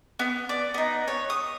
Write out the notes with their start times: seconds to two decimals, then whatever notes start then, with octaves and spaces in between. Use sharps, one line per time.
0.19 B3
0.49 D5
0.74 B3 D#4
1.08 C#5
1.30 D#6